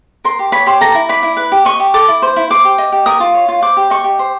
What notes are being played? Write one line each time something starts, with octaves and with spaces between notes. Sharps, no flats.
A#4 C6
G4
C#5 B5
G4 C6
A4 A#5
E4
D5 B5
E4
B4
G4
D#5 C#6
G4
A4 D6
E4
C5
E4
C5 D6
G4
D#5
G4
A#4 D#6
F4
C#5
F4
C5 D6
G4
D#5 C#6
G4
C5